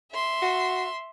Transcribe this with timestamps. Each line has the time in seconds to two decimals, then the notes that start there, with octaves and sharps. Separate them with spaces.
0.12 E5 C6
0.42 F#4